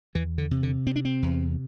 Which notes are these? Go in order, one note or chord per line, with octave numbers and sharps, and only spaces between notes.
E2 E3
D3
C3
D3
C3 C4
D4
C4
E2